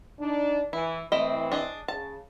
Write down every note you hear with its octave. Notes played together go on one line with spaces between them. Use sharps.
D4 D#4
E3 E4
E3 A3 C4 E4 D#5
D4 G#4 D#5
C#3 A5